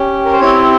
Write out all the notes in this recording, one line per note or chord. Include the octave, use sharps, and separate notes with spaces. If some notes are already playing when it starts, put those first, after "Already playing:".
Already playing: C#4 G4
A#4
C5
C4 E4 G4 C#5